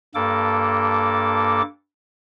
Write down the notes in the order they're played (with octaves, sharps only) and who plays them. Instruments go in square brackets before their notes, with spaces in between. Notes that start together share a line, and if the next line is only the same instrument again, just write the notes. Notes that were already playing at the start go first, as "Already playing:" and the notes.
[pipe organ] G2 A#3 A4 D6